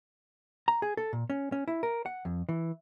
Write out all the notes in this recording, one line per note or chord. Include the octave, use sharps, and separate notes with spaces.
A#5
G#4
A4
A#2
C#4
C#4
E4
A#4
F#5
F2
E3